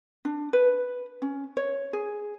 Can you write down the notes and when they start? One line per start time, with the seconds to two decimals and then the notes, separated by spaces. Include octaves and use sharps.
0.25 D4
0.53 B4
1.22 C#4
1.57 C#5
1.93 G#4